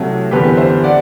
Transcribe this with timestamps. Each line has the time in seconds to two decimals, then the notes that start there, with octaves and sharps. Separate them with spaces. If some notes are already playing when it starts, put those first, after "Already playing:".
Already playing: C2 C3 F#3 A3
0.31 F#1 E2 D3 G3 G4 B4
0.57 C5 E5
0.84 D5 F#5